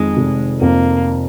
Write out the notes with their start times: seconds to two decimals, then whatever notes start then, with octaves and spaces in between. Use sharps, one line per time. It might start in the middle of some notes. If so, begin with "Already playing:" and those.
Already playing: F2 D#3 G#3
0.17 F1
0.60 F2 A#3